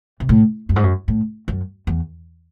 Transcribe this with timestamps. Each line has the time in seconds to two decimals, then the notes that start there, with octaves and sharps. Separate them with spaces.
0.20 C3
0.29 A2
0.69 F#2
0.76 G#2
0.84 F#2
1.08 A2
1.48 F#2
1.87 E2